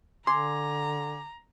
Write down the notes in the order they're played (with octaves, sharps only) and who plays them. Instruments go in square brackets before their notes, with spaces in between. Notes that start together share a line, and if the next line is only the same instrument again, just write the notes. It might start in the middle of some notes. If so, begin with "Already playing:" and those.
[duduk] D3 [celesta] G#5 D6 G#6 [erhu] A#5 [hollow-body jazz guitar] C6